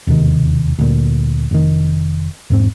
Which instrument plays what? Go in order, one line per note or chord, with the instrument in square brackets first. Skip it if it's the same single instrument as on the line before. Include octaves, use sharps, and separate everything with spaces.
[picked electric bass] E1 D#2 C3 D#3
D2 A#2
F1 D#3
E1 G#2 C4